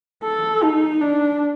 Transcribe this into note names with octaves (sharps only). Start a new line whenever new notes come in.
A4
D#4
D4